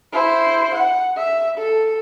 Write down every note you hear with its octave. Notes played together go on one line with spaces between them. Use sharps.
E4 C5
F#5
E5
A4